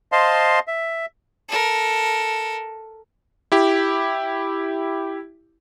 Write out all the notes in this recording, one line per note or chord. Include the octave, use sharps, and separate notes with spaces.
C5 D#5 F5 A5 C6
E5
A4 A#4
E4 G4